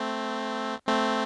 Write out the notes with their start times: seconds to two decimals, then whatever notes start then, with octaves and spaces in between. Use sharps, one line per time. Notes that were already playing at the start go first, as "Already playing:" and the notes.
Already playing: A3 C4
0.87 A3 C4